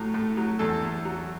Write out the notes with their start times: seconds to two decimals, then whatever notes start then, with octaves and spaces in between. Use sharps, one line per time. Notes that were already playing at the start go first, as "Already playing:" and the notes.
Already playing: A2 F#3
0.14 A2
0.37 F#3
0.59 E2 A4
0.83 E2
1.05 F#3